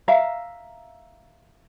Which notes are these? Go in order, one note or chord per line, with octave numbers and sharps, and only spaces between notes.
E5 F5 A#5